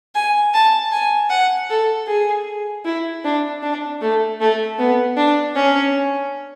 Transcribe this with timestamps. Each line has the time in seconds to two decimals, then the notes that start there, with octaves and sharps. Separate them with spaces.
0.15 G#5
0.53 A5
0.91 G#5
1.30 F#5
1.69 A4
2.07 G#4
2.85 E4
3.24 D4
3.63 D4
4.01 A3
4.40 A3
4.79 B3
5.17 D4
5.55 C#4